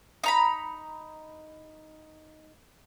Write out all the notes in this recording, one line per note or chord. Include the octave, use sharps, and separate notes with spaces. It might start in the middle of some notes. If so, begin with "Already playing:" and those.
D#4 A#5 B5